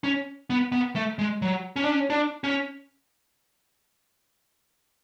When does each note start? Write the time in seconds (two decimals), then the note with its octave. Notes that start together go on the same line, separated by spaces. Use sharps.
0.04 C#4
0.50 B3
0.72 B3
0.96 A3
1.19 G#3
1.42 F#3
1.76 C#4
1.84 D4
1.92 C#4
2.10 D4
2.44 C#4